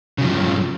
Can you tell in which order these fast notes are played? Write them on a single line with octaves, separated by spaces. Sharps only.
C#3 F#3 F3 G2